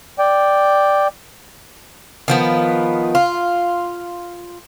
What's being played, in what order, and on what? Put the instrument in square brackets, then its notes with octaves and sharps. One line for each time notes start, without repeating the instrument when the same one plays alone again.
[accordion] D5 G5
[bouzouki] D#3 F3 B3
F4